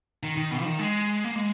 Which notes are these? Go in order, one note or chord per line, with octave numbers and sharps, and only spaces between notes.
D#3
D#3
B2
F3
D#3
G#3
A#3
G#3